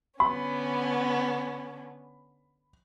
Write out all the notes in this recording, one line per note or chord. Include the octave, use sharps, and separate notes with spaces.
D3 B3 C#4 B5